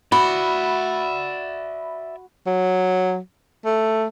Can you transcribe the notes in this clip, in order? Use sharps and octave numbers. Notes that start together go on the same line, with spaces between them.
F#4 D5 E5 B5
F#3
A3